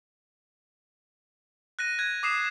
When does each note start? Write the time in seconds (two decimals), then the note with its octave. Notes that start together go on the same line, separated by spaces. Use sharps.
1.79 F#6 A#6 D#7
1.99 F#6 G#6
2.23 D6 D#6 C7 E7